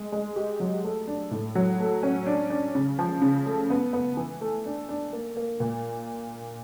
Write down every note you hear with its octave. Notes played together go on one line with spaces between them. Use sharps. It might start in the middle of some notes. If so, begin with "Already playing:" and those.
Already playing: G#3
G#3
G4
F#3
A3
D4
A2
F#3
A3
C#4
D4
D4
C#3
F3
C#3
A3
B3
B3
E3
A3
D4
D4
A#3
A#3
A#2